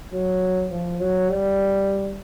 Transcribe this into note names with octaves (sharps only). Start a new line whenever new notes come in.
F#3
F3
F#3
G3